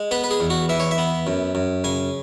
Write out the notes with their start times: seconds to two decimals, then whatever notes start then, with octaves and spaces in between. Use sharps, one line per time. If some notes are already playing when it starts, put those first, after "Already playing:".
Already playing: G#3
0.11 B3 B4
0.24 B4
0.31 G#4
0.40 E2
0.50 F#4
0.69 E3 E5
0.80 C#5
0.91 E5
0.98 B3
1.27 F#2
1.55 F#2
1.84 C#3 G#5